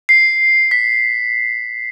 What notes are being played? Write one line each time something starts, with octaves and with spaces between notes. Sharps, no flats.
C7
B6